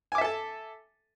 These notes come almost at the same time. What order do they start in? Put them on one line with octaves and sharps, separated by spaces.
G#5 D6 E5 A4 A5